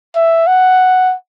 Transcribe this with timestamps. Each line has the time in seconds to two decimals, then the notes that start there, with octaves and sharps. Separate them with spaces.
0.16 E5
0.47 F#5